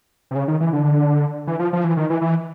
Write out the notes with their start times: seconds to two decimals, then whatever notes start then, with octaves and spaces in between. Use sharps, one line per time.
0.31 C3
0.35 C#3
0.48 D#3
0.61 E3
0.73 D3
1.47 E3
1.59 F3
1.73 F3
1.84 E3
1.97 D#3
2.10 E3
2.21 E3